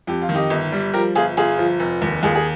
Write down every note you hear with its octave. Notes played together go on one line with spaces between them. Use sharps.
F2 G4
F4
D#3
D#4 G4
G1
G3
F3 G4 A#4
G1 F4 G#4
G1 F4 G#4
F3
F1
D#2
D#2 F4 G#4
G#4